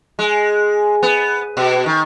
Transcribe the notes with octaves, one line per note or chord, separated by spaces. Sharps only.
G#3
B3
B2
D#3